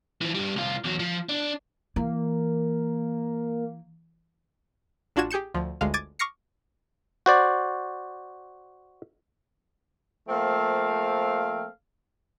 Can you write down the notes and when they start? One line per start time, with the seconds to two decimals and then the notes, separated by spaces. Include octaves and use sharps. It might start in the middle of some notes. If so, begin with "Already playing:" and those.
0.21 E3 F3
0.35 G2 G3
0.56 C2 F4
0.84 E2 F#3
1.00 F3
1.29 D4
1.96 E3 A#3
5.16 A1 D4 F4 F#4 G#6 E7
5.31 G4 G#4 G6 C#7 E7
5.54 D2 F3
5.81 G1 D2 G#3 F5
5.94 D6 G#6 A6 D#7
6.19 C#6 D6 F6 A#6 C7 C#7
7.26 F#4 C5 D5
10.29 F3 A3 A#3 C4 F5